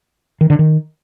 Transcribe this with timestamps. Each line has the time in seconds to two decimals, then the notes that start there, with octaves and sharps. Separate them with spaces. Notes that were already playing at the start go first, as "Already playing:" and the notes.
0.41 D#3
0.50 D3
0.59 D#3